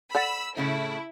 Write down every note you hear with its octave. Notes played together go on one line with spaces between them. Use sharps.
A4 D5 F#5 B5 E6
A2 C#3 A3 E4